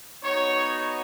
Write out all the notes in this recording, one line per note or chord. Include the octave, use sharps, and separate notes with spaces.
B3 D#4 F#4 C#5